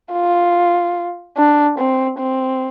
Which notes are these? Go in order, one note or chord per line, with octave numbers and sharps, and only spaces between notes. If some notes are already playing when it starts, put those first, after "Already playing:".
F4
D4
C4
C4